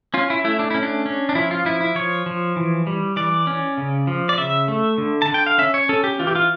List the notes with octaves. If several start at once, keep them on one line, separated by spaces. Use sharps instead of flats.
C#4 F4
E4
A3 E4
D4
C#4 E4
D4
C#4
D4
F3 E4
F4
F3 E4
E4
F3 C#5
F3
E3
G3
E3 D5
C#4
C#3
F3
D5
C#3 E5
A3
D3
A5
D3
G5
F5
C#4 E5
C#5
C#4 A4
G4
E3 F4
G4
F4